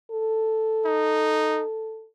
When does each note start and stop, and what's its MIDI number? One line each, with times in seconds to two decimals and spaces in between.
0.11 2.06 69
0.85 1.63 63